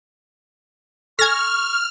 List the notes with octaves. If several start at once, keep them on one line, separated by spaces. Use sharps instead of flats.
A4 G#5 C#6 F6 G#6 A#6